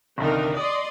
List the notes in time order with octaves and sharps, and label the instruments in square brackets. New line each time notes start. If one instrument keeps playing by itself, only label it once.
[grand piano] G1 C2 D#3 [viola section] D4 D#4 A#4
[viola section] D5 D#5 C6 [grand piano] D#6